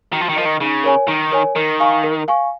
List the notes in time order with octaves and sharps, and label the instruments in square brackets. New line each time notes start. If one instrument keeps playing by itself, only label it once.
[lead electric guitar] D#3 [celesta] F#4
[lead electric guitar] F3
D#3
[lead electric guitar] F3 [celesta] A#4 D#5
[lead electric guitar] D#3
[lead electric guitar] C#3 [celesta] D#4
[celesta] A#4 C#5 G#5
[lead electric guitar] D#3 [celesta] D#4
[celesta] A#4 C#5 G#5
[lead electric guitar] D#3 [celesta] A#4
[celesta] F5 G#5 C#6
A#4
F5 G#5 C#6